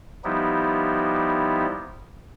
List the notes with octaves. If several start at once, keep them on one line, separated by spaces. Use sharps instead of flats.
F3 G3 B3 D#4 E4 G4